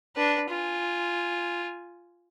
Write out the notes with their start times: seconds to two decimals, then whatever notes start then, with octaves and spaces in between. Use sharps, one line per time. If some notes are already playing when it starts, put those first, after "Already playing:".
0.16 D4 B4
0.50 F4 G#5